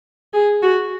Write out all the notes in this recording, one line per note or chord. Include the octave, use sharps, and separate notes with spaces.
G#4
F#4